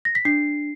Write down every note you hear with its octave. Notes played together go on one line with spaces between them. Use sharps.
A#6
B6
D4 C7